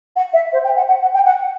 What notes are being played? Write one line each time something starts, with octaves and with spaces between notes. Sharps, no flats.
F#5
E5
C5
G5
F#5
F#5
F#5
G5
F#5